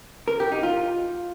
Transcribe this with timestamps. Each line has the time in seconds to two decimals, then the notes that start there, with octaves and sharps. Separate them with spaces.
0.28 A#4
0.40 G4
0.52 D#4
0.63 F4